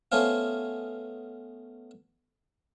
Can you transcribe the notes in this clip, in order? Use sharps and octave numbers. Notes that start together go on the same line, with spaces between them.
A3 B3 C#4 C5 C#5 F5